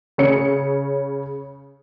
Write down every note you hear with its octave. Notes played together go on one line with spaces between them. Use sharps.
C#3 C#5 C#7